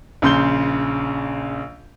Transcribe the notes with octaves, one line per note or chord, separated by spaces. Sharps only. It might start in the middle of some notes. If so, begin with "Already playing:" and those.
A#1 C#3 C6 G6 G7